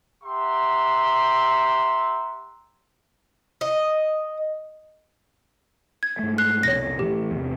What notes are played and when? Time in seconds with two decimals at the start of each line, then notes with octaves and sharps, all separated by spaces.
0.24 G4 E5 F#5 A#5 C6
3.61 D#5
6.03 G#6
6.19 G#2 A3
6.38 F#6 C7
6.63 C2 F2 B2 C#5 A#6
6.99 A2 E3 G4
7.31 E2 C3